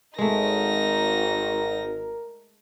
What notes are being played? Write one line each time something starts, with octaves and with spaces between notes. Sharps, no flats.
G#1 G#3 A3 D#4 A#4 A#6